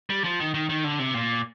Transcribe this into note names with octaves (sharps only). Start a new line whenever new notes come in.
G3
F3
D#3
D#3
D#3
D3
C3
A#2